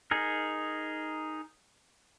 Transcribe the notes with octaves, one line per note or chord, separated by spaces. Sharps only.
D#4 G#4 A#4